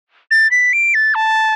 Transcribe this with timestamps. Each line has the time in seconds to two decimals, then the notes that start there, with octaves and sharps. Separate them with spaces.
0.31 A6
0.51 B6
0.73 D7
0.94 A6
1.15 A5